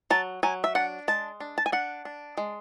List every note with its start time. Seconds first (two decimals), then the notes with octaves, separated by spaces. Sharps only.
0.10 F#3 A5
0.43 F#3 G#5
0.64 E5
0.75 D4 F#5
1.08 G#3 A5
1.40 D4
1.58 A5
1.66 G#5
1.72 D4 F#5
2.05 D4
2.37 G#3